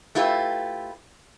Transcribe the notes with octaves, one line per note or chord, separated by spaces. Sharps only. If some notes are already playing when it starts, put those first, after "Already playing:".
A3 E4 F4 G4 B4